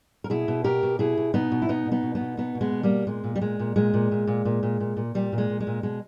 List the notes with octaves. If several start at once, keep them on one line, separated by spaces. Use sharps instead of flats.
A#4
B2 E4 G#4
B2
B2 G4 A#4
B2
B2 E4 G#4
B2
B2 B3 D#4
B2
E4
B2 B3 D#4
B2
B3 D#4
B2
B3 D#4
B2
B2 B3 D#4
B2
G#3 B3
B2
G3 A#3
B2
A#2 G#3
A#2
G3
A#2 G#3
A#2
A#2 G#3
A#2
A#2
A#2
A#2
A#2
A#2
A#2
A#2 G3
A#2
G#3
A#2
G#3
A#2
B2 G#3